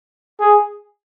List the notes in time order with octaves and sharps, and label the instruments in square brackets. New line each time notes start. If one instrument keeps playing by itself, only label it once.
[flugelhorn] G#4